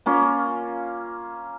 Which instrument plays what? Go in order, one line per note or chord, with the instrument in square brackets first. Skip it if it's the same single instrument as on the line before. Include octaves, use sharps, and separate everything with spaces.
[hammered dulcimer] A#3 C#4 F4